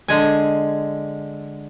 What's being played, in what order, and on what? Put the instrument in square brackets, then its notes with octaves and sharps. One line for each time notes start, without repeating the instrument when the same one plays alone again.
[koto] D3 G#3 G#5